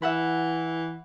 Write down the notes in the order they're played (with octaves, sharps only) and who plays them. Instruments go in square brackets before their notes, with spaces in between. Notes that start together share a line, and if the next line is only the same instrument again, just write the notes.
[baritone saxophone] E3 [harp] E5 F#5 B5